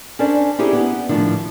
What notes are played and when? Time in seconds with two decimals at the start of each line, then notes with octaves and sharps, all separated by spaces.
0.19 C#4 D4 A#4 C5 D5
0.59 D#4 E4 G4 G#4 C5
0.73 B3
1.09 A2 D3 D#3 F3 D4